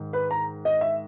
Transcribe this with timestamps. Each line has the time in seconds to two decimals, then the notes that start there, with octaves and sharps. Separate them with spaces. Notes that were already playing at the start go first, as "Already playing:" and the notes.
Already playing: G#2 D#3
0.13 B4
0.31 A#5
0.65 D#5
0.81 E5